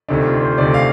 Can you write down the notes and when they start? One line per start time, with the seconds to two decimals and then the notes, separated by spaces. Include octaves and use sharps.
0.09 D2 C3 D#3 D4
0.26 F4
0.42 C5
0.58 D2 C3 D#3 D5
0.74 F5